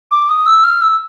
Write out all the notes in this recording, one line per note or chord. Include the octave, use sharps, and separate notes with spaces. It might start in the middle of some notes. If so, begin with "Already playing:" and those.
D6
D#6
E6
F6
E6